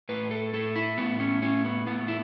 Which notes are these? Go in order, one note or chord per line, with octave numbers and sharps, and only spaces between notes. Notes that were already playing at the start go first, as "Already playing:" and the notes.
A2 B4
A4
A2 A4
E4
A2 B3
C#4
A2 C#4
B3
A2 B3
E4